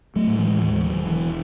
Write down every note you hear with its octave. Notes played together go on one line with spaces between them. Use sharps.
F#3 A3
A2
E3 G#3
D#2 E3 G#3
D#3 F#3
E1
E3